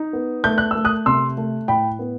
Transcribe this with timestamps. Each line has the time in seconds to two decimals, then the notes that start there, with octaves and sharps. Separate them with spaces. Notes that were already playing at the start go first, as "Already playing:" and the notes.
Already playing: D#4
0.13 B3
0.44 A3 G6
0.58 F#6
0.71 A3 E6
0.85 D#6 F#6
1.06 C3 C6 E6
1.37 A3
1.68 A2 G5 B5
1.99 B3